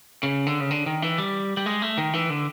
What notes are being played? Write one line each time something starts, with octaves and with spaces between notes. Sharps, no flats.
C#3
D3
C#3
D3
D#3
E3
G3
G3
G#3
A3
D#3
E3
D3